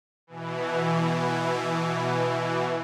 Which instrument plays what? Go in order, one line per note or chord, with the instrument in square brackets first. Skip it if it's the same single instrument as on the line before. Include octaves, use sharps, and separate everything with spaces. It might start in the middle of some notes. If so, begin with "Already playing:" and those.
[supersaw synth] B2 E3